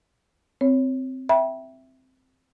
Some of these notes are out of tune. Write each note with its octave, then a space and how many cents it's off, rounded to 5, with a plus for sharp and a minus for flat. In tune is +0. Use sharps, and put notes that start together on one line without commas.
C4 -5 C#5 +0
E5 +0 G5 -15 B5 -40